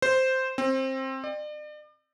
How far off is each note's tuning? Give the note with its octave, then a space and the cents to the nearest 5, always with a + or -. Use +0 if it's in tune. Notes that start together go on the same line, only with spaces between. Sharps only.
C5 -5
C4 +20
D5 +40